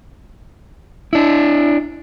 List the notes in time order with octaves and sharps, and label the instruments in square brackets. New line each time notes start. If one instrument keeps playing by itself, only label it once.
[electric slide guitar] D4 E4